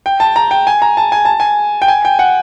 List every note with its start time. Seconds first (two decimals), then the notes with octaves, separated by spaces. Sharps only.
0.06 G5
0.20 A5
0.36 A#5
0.51 G5
0.67 G#5
0.82 A#5
0.97 A5
1.12 G#5
1.25 A5
1.40 G#5
1.82 G5
1.88 G#5
2.05 G5
2.19 F#5